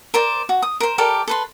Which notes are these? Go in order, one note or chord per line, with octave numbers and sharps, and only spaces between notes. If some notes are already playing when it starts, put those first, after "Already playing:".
A#4 C5 D5
F#4
D#6
A#4 C5
G4 A4 A#4 D5
A4 B4 C6